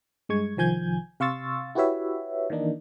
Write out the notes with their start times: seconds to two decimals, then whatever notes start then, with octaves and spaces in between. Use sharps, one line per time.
0.29 G2 G#3 C#6 G#6
0.57 C2 D#3 F3 G#5 G6 G#6
1.20 C3 F5 C6 C#6 E6 A6
1.75 E4 F#4 G4 B4 C#5 E5
2.50 D#3 E3 A#3 D4 D#4